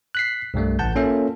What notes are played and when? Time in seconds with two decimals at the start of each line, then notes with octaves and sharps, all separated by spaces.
0.15 F#6 B6 C7
0.54 C2 G2 G3 A3
0.79 A1 F#5 A5 G6
0.95 A#3 C#4 F4 A4 E5